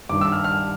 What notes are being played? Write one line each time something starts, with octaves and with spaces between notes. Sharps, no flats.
G2 D#3 D6
E6
F6
F6